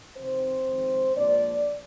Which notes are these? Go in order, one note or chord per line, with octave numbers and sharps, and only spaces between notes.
F2 C3 D#3 C4 C5
F2 D#3 G#3
A#2 F3 G#3 D4 D5